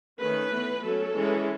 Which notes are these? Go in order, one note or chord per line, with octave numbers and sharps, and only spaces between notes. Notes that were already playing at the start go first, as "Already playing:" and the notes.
D#3 A3 C#4 B4
E3 B3
F#3 A3 C#4 A4
E3 G#3 C#4